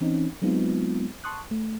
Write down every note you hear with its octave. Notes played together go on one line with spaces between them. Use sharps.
E3 C4 C#4 D#4
F#3 G#3 B3 C4 D#4 F4
A5 C6 C#6 D#6 F#6
A3